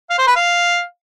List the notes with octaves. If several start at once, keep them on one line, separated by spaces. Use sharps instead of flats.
F5
C5
B4
F5